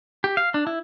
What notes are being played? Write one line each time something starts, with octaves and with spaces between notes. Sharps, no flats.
G4
F5
D4
E4